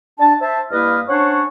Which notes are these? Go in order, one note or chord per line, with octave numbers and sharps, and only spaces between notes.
D4 A5
C5 E5 A5
G2 A#3 E4 B4 D#5 F6
C#4 D4 C5 C#5 F#5 C#6